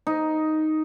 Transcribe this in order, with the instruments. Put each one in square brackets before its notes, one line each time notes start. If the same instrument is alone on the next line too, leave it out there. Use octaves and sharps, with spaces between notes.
[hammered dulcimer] D#4